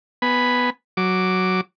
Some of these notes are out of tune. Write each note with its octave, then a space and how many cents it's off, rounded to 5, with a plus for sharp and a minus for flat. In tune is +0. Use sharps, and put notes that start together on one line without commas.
B3 +0 G#5 +0 B5 +0
F#3 +0 D6 +0